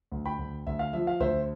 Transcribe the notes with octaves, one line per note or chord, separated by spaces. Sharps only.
D2
G5 B5
D2
D2 E5
F5
F3 E5
F5
D2 C5 E5